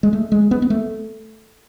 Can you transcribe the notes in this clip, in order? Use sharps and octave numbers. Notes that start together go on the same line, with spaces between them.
G#3
A3
G#3
B3
B3
A3